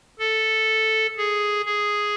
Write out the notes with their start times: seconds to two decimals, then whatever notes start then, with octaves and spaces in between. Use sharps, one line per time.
0.19 A4
1.17 G#4
1.65 G#4